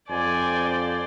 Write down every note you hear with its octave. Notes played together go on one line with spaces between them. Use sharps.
F2 C5 D5 G#5